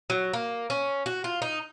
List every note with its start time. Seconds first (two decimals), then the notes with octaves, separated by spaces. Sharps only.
0.10 F#3
0.33 A#3
0.70 C#4
1.06 F#4
1.24 F4
1.42 D#4